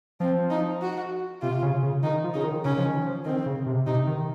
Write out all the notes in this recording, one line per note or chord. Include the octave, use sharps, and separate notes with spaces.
F3 C4
D#4
F#4
C3 F4
C#3
C#3
D#3 D#4
F3
C#3 D#4
D#3
C#3 C#4
F3
D#3
F3
D#3 C4
C#3
C3
C3 D#4
D#3